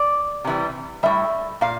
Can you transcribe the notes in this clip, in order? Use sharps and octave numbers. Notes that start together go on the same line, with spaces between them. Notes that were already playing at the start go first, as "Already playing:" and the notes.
Already playing: D5
C3 E3 G3
A2 G3 E5
A#2 F5